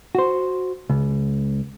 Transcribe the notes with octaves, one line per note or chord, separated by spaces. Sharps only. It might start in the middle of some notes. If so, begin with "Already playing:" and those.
F#4 C5
C#2